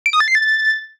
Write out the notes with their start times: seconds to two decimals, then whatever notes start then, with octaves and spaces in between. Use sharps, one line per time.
0.06 D7
0.13 D#6
0.20 A6
0.28 C7
0.35 A6